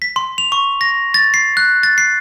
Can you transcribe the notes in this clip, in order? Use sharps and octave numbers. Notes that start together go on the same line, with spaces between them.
B6
C6
F7
C#6
A#6
A6
C7
F#6
A6
C7